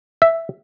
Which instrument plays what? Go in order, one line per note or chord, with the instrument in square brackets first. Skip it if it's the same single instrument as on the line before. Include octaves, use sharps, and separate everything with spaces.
[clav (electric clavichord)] E5